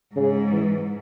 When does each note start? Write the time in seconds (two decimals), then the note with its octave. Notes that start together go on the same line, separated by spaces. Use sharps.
0.15 G#2 C#3
0.52 E3